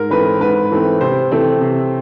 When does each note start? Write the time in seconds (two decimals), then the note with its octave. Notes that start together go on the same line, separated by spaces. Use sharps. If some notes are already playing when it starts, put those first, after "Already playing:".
Already playing: G#2 A#4
0.10 E3 A3 C4 B4
0.41 G#2 B4
0.71 E3 A3 C4
1.01 C3 C5
1.32 E3 A3 C4
1.61 C3